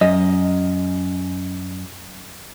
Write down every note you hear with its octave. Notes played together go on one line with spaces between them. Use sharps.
F#2 D#5